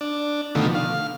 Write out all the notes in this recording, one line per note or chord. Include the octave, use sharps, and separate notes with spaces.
D4
B2 D3 D#3 F3 A3
F5